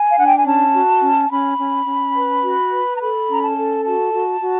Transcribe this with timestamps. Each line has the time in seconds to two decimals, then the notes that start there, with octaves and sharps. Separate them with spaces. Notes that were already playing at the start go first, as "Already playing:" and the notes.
Already playing: G#5
0.10 F5
0.17 D4 F#5
0.27 G5
0.36 G#5
0.45 C#4 A5
0.73 F#4
1.02 C#4
1.30 C#4 B5
1.58 C#4
1.87 C#4
2.16 B4
2.44 F#4
2.71 B4
2.96 A#5
3.01 A4 B5
3.29 C#4 A#5
3.43 A5
3.57 A4
3.85 F#4 A5
4.13 F#4
4.41 F#4